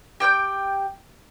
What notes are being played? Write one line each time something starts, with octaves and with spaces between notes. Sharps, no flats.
G4 G5 F#6 G6